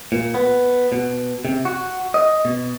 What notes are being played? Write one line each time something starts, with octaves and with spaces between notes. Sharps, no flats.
A#2
B3
B2
C3
F#4
D#5
B2